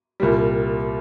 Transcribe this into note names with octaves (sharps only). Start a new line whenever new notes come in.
C2 A#2 G3